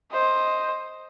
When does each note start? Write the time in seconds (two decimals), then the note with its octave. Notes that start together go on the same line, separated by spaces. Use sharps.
0.11 C5 D#5